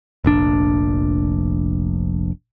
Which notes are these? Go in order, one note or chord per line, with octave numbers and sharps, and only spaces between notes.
F1 A#1 D4